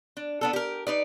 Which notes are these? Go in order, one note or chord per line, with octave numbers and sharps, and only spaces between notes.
D4
B3 D4 A4
G4 A#4
D#4 B4 D5